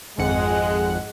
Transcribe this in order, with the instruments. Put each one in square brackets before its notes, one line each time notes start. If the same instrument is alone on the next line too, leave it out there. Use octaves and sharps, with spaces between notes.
[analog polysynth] G#1 F2 F#5 [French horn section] G#3